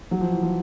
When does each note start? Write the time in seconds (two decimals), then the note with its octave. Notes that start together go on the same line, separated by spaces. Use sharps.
0.11 F#3
0.21 F3
0.31 E3
0.43 F3